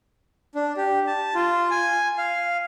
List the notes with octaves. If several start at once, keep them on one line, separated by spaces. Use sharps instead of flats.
D4
G4
A5
F4
G#5
F5